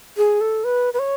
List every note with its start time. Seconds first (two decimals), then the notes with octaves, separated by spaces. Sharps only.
0.17 G#4
0.41 A4
0.64 B4
0.94 B4
0.99 C#5